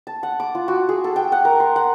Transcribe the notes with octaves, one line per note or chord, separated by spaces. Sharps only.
A5
F#5
D6
F4
F#4
G#4
A4
G5
F#5
A#4
C6
F#5